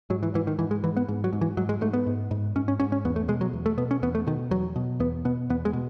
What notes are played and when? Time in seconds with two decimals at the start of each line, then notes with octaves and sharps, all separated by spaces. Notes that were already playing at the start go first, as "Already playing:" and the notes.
0.10 G#2 F#3
0.23 E3
0.34 G#2 E3
0.47 D#3
0.59 G#2 E3
0.71 G#3
0.84 G#2 E3
0.97 B3
1.08 G#2
1.24 F#3
1.33 G#2
1.41 E3
1.57 G#2 F#3
1.69 G#3
1.81 G#2 A3
1.93 B3
2.06 G#2
2.31 G#2
2.56 G#2 C#4
2.68 C#4
2.80 G#2 C#4
2.92 C#4
3.05 E2 B3
3.16 A3
3.28 B2 G#3
3.41 F#3
3.53 E2
3.66 A3
3.78 B2 B3
3.91 C#4
4.02 E2 B3
4.15 A3
4.27 B2 D#3
4.51 E2 F#3
4.76 B2
5.00 E2 B3
5.25 B2 B3
5.50 E2 B3
5.65 G#3
5.73 B2